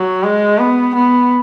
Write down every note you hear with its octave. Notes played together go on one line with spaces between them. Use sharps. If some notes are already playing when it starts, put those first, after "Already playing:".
Already playing: F#3
G#3
B3
B3